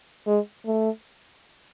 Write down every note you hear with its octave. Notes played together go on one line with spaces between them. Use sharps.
G#3
A3